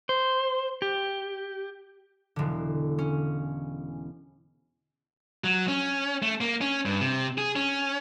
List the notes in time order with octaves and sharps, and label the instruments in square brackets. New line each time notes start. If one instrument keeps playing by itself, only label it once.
[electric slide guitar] C5
G4
[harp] E1 D3
C#4
[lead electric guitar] F#3
C#4
A3
A#3
C#4
G2
C3
G#4
C#4